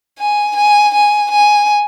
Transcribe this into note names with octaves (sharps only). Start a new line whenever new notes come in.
G#5
G#5
G#5
G#5